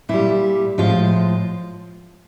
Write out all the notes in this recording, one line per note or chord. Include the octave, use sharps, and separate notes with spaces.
A#2 G3 E4
A2 F3 G#3 F4